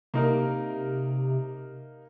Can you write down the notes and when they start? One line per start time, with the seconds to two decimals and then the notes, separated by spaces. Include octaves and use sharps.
0.14 C3 A#3 D#4 A#4